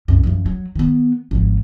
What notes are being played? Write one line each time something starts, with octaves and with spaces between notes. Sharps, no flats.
C2 F#2
F#2 F3
F#3
D#3 B3
G#1 F3